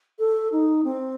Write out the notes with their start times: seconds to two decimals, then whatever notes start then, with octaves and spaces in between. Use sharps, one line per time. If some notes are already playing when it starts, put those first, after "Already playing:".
0.19 A4
0.52 D#4
0.84 C4